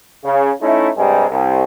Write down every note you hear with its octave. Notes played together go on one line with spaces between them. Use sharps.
C#3
A3 C#4 D#4 E4
G2 C3 G3 G#3
C2